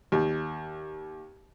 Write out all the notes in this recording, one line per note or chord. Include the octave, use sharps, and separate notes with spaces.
D#2